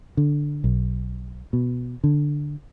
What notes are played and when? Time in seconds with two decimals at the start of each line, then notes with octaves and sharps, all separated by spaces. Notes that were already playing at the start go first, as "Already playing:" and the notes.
0.17 D3
0.64 B1
1.53 B2
2.04 D3